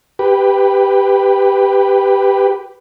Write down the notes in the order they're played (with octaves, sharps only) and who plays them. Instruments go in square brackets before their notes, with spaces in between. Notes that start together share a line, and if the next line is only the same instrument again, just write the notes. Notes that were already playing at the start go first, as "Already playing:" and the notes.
[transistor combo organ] G4 B4